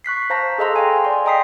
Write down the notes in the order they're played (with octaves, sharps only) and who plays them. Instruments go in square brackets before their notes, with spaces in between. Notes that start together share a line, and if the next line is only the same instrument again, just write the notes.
[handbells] C#6 F#6 B6 C7
C5 F5 A5 A#5 A#6
G#4 A4 D#5 F5 A#5 C6
F5 G5 G#5
D5 C6
D#5 G5 A#5 D#6 B6 C7